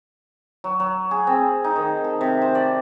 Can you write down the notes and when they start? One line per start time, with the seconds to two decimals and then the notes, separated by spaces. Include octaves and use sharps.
0.64 F#3
0.80 F#3
1.11 G#4
1.27 C4
1.64 D#4
1.76 D#3
2.04 A4
2.21 C3
2.42 C5
2.55 D5